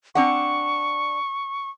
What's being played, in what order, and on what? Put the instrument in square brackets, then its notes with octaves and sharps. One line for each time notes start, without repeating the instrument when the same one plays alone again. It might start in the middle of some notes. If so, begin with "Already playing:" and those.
[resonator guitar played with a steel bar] C4 D4 F#5 [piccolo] C#6